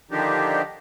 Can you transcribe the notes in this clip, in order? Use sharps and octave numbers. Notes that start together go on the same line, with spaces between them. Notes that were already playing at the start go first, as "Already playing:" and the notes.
D3 D#3 F3 D4 D#4 G4